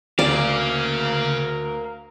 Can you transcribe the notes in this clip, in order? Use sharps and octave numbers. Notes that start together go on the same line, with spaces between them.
D2 C#3 A#4 D5 F5